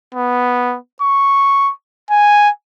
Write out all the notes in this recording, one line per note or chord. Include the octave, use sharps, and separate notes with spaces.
B3
C#6
G#5